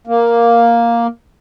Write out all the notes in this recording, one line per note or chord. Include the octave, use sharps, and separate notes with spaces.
A#3